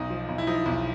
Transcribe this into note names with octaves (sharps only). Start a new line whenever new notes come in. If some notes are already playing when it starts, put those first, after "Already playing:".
Already playing: B1 D#4
F3
B1
E4
F3 D#4
B1